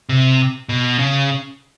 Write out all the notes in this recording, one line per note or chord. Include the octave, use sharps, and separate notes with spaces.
C3
B2
C#3